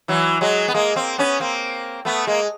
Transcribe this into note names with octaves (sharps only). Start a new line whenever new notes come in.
E3 F#3
F#3 G#3
B3
G#3 A#3
A#3 C4
B3 C#4
A#3 C4
A3 B3
G#3 A#3